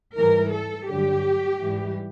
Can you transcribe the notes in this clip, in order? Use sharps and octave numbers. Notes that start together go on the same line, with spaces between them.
G#2 E3 G3 A#4
A4
G2 D3 F#3 G4
G#2 E3 G3